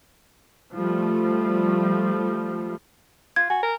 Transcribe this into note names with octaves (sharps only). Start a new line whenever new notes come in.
F3 G3 A3
F4 G#6
F#4 G#5
A#4